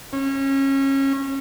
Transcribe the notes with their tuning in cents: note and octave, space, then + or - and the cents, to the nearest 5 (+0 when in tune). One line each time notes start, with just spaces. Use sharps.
C#4 -25